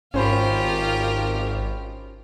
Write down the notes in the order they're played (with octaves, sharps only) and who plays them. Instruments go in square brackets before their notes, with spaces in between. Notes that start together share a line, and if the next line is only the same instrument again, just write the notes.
[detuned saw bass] G#1 [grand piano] C#4 C5 B5 [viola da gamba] F4 G4 A#4